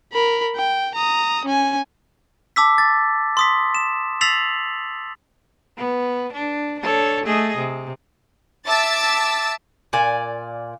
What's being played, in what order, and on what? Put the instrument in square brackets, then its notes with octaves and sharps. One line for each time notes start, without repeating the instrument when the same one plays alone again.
[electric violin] A#4 B5
G5
A#5 D#6
C#4 G#5
[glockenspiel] A5 D6 E6 B6
A6
C6 D#6 B6
E7
E6 A6 B6 C7 F7 F#7
[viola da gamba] B3
D4
D4 A4 C#5
A3 G#4 D#5
C3
[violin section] E5 A5 D6 E6 A6
[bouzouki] A#2 D5 G#5